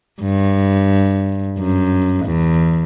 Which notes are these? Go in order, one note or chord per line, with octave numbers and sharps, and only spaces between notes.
G2
F#2
E2